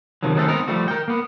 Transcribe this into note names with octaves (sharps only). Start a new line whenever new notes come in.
C3 D#3 F3 F#3
D#3 F#3 G#3 A3 C4 A4
B3 C4 D#4 A#4
F3 G3 A3 F#4
A#4 G5
A#3 B3